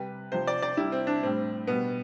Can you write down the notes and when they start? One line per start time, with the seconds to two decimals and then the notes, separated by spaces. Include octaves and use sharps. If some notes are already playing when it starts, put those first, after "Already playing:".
Already playing: C3 G3 B4
0.32 C3 F3 C5
0.47 D5
0.62 D5
0.77 C3 G3 E4
0.92 C4
1.07 D4
1.23 A2 G3 C4
1.67 B2 G3 B3